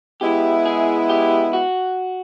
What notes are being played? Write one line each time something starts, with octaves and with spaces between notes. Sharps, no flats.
G#3 B3 E4 G4
G#4
G4
F#4